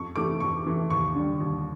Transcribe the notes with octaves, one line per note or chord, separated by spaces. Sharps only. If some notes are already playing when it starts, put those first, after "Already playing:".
Already playing: F2 C#6
C3 E3 A3 D6
F2 C#6
C3 E3 A3
D#2 C#6
D3 G3
D#2